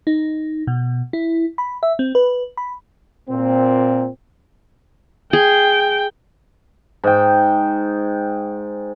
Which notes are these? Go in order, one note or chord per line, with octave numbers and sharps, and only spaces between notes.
D#4
B2
E4
B5
E5
C4
B4
B5
A#2 C4
G#4 G5
G#2 G5